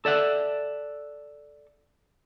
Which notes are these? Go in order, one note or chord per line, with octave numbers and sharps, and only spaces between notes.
A4 D5 E5 F#5